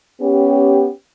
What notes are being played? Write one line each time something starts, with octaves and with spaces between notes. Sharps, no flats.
B3 C#4 G4